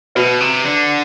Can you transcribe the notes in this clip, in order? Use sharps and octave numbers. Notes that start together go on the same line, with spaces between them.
B2 F#4 B4 E5
C3
D3